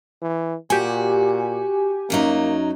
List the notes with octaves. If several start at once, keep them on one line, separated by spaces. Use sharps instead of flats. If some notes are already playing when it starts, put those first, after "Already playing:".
E3
A#2 F#4 G4 G#5
F#2 F#3 A#3 D#4